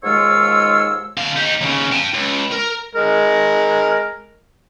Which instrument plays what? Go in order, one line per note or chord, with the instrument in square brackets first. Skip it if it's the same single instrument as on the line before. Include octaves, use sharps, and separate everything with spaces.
[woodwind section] D#2 G#2 G#3 F4 C#5 E6
[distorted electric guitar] D3 F5
D#4 G4
D#2 C#3
G5 A5
C#2
A#4
[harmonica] G#3 A#4